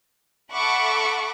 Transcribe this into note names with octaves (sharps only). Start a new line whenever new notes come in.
A4 E5 F#5 B5 C#6 D6